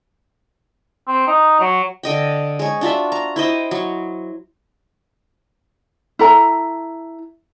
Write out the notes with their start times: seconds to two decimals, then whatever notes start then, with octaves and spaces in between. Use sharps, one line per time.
1.08 C4
1.27 D#4
1.60 F#3
2.03 D3 D#5 G5
2.59 G#3 C#5
2.81 D4 F4 F#4 E5
3.12 A#5
3.36 E4 C5 D#5 G5
3.71 F#3
6.19 E4 A4 A#5